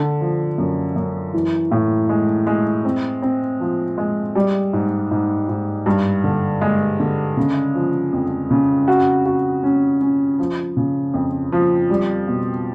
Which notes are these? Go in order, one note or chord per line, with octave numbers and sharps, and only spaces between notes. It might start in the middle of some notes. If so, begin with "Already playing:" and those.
Already playing: D3
F3
F#2
F#2
E3
A2
G#3
G#3
C4
C4
F3
G#3
G3
G#2
G#2
G#2
G2
D3
G#3
D3
C#3
F3
F2
C#3
F#4
F#4
C#4
C#4
F3
C#3
F2
F3
G3
B2